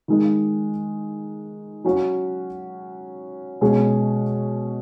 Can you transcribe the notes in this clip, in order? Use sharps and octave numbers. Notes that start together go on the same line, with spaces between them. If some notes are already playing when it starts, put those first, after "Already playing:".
D#3 G#3 D#4
F#3 C#4 F#4 C#5
B2 G#3 C#4 G#4 C#5